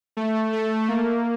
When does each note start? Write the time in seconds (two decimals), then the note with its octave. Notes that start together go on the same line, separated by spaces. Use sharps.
0.17 A3
0.53 A3
0.89 A#3